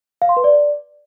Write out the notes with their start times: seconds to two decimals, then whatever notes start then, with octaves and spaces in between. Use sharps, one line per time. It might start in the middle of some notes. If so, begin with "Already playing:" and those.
0.22 F5
0.29 C6
0.37 B4
0.44 D5